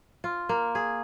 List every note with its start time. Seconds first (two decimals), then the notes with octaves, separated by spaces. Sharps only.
0.24 F4
0.49 A#3
0.75 G#4